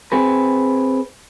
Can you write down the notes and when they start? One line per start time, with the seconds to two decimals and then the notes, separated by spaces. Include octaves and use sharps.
0.12 C4 G#4 B4